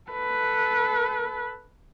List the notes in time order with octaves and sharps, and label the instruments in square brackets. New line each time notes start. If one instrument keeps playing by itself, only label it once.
[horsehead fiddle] A4 B4